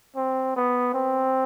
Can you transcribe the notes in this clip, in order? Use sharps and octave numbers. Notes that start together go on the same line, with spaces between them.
C4
B3
C4